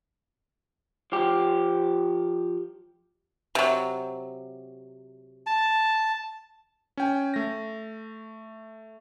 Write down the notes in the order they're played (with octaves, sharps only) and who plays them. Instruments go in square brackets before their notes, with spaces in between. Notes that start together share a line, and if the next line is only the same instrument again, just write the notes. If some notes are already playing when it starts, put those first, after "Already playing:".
[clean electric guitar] F3 G4
[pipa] C3 F#3
[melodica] A5
[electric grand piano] C#4 G5 G#5
A3 A#6